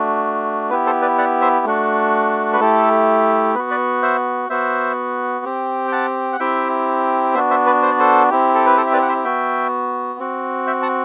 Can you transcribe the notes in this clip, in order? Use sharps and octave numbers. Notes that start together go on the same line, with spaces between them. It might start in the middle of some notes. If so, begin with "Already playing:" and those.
Already playing: A3 D4 F#4
B3 E4 G4 B4
A4 C5
B4 D5
D5 F#5
C5 E5
A3 D4 F#4
B4
A3 E4 G4 A4
B3 F#4 B4
B4 D5
C5 E5
B3 F#4 C5 E5
C4 G4
G5
F#5 A5
F#5
C4 E4 G4 E5 G5
B3 D4 F#4 C5 E5
C5 E5
B4 D5
C5
D5
A4 C5
C4 E4 G4
A4
B4
A4 C5
E5
B4 D5
F#5
C5 E5
B3 F#4 E5 G5
C4 F#4
E5 G5
F#5 A5